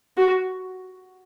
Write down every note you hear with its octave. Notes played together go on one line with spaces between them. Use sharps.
F#4